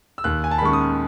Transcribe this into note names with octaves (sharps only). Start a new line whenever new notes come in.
E6
D#2 F#6
G#5
A5
B5
D#3 G#3 C#4 C#6
D#6